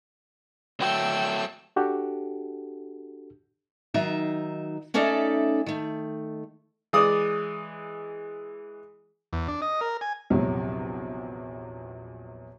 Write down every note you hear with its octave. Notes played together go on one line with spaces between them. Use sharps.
F#3 A3 G5 E6
D4 F#4 G4 A4
D#3 F#3 D#4 E5
A3 C#4 D#4 A4 D5 E5
D#3 A3
E3 G#3 D5 D#6
E2
D4
D#5
A#4
G#5
A#1 E2 C3 F3 F#3